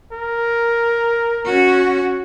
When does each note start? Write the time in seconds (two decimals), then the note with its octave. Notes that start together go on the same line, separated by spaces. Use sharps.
0.12 A#4
1.45 C#4 F#4